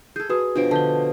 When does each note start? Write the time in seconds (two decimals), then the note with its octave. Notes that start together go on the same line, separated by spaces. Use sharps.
0.16 G#4 A4 G6 G#6
0.29 F#4 G#4 B4 D#6
0.56 B2 F3 D4 D7
0.71 D3 A5 G6 G7